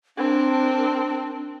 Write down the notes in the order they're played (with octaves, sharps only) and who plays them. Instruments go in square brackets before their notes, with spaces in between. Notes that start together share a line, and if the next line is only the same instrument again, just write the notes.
[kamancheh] C4 A#4 [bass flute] D4